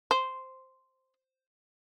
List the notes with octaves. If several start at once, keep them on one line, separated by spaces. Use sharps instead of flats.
C5